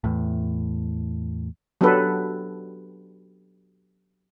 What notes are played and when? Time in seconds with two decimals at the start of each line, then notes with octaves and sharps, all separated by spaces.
0.04 E2 A2
1.81 F#3 B3 D4 G4 A4 B4